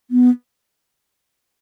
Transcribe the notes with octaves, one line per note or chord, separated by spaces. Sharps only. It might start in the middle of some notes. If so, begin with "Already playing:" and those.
B3